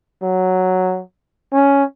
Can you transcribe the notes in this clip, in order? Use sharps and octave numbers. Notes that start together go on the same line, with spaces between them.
F#3
C#4